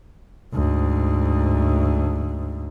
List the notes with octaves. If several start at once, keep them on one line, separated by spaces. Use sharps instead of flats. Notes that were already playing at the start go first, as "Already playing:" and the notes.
D2 G#2